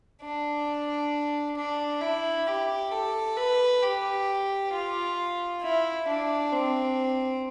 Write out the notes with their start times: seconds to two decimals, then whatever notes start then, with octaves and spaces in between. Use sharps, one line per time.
0.22 D4
1.57 D4
2.01 E4
2.47 G4
2.91 A4
3.37 B4
3.82 G4
4.73 F4
5.62 E4
6.07 D4
6.52 C4